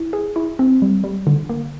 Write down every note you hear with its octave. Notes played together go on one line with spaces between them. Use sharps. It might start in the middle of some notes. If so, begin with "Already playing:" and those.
Already playing: E4
G#4
E4
C4
G3
G3
D3
A#3